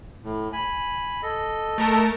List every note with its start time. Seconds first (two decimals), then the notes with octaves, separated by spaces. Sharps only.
0.24 A2
0.53 G#5 B5
1.23 A4 D#5
1.78 A3 A#4 A5